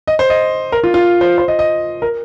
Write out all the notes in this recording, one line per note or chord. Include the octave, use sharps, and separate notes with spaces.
D#5
C5
D#5
A#4
F4
F4
C5
C5
D#5
D#5
A#4